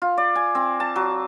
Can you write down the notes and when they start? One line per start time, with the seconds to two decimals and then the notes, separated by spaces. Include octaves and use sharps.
0.02 F4
0.17 D5
0.35 G#5
0.55 C4
0.80 A5
0.96 F#3